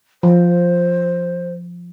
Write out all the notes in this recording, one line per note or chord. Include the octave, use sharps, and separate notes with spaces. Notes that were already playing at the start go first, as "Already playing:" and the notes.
F3 C5